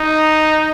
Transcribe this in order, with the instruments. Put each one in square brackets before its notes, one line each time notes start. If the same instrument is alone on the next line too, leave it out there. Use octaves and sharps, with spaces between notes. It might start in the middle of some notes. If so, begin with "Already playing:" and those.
Already playing: [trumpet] D#4